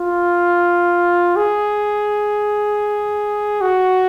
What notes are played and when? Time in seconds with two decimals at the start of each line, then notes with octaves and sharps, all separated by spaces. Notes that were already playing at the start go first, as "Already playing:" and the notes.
Already playing: F4
1.36 G#4
3.61 F#4